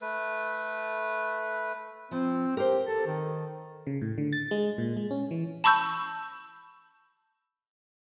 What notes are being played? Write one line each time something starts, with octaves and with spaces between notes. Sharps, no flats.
A3 B4
F3 C4
G4 A#4 C5
A4
D#3
C#3
A2
D3
A6
G#3
A#2
G#3
C#4
E3
A5 B5 C#6 E6 G6